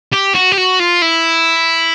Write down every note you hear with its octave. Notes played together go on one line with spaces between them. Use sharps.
G4
F#4
G4
F#4
F4
E4